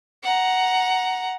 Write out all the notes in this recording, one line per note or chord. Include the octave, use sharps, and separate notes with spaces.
F#5 A#5